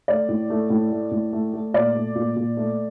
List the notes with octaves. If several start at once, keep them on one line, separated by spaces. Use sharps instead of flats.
A3 D5
A2
A3
A2
A3
A2
A3
A3
A#2 D5
A3
A#2
A#2
A3